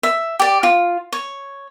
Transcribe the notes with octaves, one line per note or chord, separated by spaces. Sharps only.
E5
G4 D5
F4
C#5